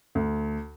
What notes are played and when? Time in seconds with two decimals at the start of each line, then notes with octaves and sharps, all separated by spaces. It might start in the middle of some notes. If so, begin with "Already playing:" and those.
0.15 D2